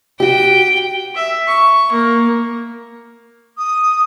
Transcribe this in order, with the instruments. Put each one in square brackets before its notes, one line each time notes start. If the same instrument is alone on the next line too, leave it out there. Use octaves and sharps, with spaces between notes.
[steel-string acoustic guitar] F#4 G4 [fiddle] G5
[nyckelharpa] E5
C#6
A#3
[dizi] D#6